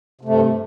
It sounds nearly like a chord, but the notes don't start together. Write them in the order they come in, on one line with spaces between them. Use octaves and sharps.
C3 A3 G2